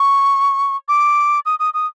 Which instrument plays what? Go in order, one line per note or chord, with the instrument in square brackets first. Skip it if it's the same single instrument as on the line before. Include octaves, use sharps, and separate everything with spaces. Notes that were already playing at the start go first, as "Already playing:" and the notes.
Already playing: [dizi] C#6
D6
D#6
D#6
D#6